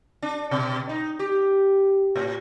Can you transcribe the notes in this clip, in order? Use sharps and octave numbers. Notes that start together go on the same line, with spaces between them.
D4
B2
D#4
G4
A2